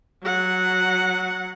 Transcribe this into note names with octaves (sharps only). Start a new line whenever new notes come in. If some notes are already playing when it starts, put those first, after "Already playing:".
F#3 F#5